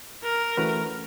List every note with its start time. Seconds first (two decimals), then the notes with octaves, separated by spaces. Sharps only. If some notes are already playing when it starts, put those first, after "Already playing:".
0.24 A#4
0.57 E3 A3 C#4 F#4 B4